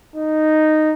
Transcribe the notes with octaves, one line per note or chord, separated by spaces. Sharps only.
D#4